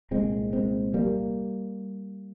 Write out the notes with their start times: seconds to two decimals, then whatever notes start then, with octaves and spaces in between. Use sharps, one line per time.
0.11 C2 A#2 G#3 C4
0.53 G#3 C4
0.94 G3 A#3